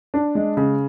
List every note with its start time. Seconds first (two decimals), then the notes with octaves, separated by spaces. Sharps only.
0.14 D4
0.35 G#3
0.57 C#3